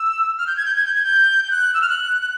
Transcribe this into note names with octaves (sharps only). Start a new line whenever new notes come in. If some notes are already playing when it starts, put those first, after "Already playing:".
Already playing: E6
F6
G6
G#6
G6
G#6
G6
G#6
G6
G6
F#6
E6
F6
F#6
F#6